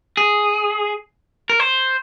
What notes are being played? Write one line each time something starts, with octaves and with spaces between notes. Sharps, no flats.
G#4
A#4
C5